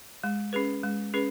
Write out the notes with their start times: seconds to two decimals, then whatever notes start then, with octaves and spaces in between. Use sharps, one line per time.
0.24 G#3
0.53 C#4 G#4 B4
0.83 G#3
1.14 C#4 G#4 B4